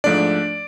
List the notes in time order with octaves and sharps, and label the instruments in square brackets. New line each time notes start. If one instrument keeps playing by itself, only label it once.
[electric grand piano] G#2 F3 A3 D4 D5